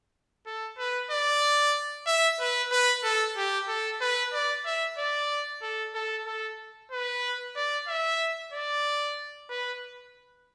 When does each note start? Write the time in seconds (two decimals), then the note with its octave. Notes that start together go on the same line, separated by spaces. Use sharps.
0.47 A4
0.78 B4
1.11 D5
2.07 E5
2.40 B4
2.72 B4
3.03 A4
3.37 G4
3.68 A4
4.01 B4
4.33 D5
4.66 E5
4.98 D5
5.62 A4
5.95 A4
6.26 A4
6.92 B4
7.56 D5
7.88 E5
8.53 D5
9.50 B4